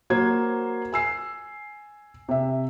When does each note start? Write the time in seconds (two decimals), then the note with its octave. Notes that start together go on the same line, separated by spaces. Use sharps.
0.10 F#3 A#3 C5 G#6
0.92 G#5 E6 C7
2.29 C3 E5